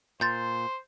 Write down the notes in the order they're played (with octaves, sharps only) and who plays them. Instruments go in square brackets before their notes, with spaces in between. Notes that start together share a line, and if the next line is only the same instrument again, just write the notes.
[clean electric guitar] A#2 [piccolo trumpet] C5 [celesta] C6 [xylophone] G6 A6